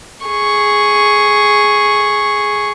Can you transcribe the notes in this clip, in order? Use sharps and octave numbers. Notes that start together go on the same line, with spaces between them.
G#4 C#6